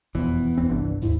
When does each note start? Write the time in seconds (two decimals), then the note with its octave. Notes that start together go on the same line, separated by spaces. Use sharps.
0.15 E1 F2 E3 B3
0.57 E1 E2 C4
0.69 G1 C2 D4
1.02 D#2 G#2 E4